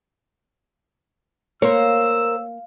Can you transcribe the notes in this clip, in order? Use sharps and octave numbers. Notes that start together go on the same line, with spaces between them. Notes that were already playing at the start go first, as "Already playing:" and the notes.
A#3 A#4 C5 C#5 E6